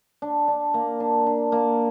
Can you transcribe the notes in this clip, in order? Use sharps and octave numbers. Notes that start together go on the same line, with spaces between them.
D4
D4
A#3
D4
D4
A#3